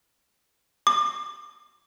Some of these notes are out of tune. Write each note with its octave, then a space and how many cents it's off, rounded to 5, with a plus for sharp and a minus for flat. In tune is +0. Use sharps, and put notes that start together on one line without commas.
D6 +35